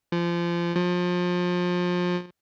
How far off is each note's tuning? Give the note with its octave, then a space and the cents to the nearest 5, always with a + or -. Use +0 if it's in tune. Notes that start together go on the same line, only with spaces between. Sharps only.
F3 -25
F3 +30